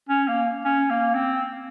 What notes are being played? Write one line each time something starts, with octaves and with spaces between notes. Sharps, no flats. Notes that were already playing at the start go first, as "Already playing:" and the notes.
C#4
A#3
C#4
A#3
C4